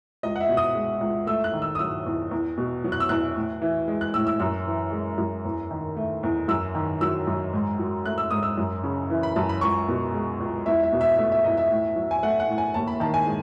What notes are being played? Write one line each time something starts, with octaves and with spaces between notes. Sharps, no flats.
C#2 D#5
F#5
E5
B2
D#6
G#3
C#2
A3 E6
F#6
D#3
E6
D#6
F#3 E6
E2
E2
B2
F#3
F#6
E6
E2 F#6
A2
E3
G#3
F#6
A2 E6
E6
F#2 E6
E3
G#3
F#2
E2
D#3
A3
E2
F#2 E6
D#3
F#3 E6
F#2
G#2
F#3
A3 F#6
E6
G#2 D#6
E6
F#2
C#3
E3
B5
F#2 A5
B5
C#2 C#6
B2
G#3
C#2
E2 E5
E5
B2
E5
A3 E5
E5
E2 D#5
E5
A2
F#3
G#5
A3 F#5
F#5
A2
G#5
D#2 A5
B5
D#3 A5
G#5
G#3